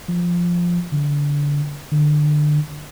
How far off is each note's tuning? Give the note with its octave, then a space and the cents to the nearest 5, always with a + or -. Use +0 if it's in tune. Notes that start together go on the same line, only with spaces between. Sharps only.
F3 +0
D3 -25
D3 +25